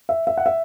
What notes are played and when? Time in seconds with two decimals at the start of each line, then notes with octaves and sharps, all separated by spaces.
0.09 E5
0.27 E5
0.38 F#5
0.46 E5